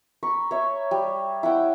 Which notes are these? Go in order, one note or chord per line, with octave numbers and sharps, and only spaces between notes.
A#5 B5 C#6
C#5 E5
G3
E4 F#5 G5 D6